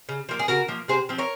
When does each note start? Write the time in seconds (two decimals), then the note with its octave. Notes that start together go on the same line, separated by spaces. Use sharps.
0.09 C#3
0.29 F3 A#3
0.39 G#4
0.48 C#3 F#4 A#4
0.68 F3 A#3
0.88 C3 G#4 C5
1.09 F3 C4
1.18 A#4 C#5